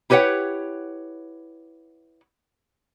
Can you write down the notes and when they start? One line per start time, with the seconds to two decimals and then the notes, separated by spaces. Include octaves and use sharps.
0.10 E4 G4 B4 C#5 F#5 G5